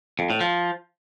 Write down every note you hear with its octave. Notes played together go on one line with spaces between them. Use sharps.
F2
A2
F3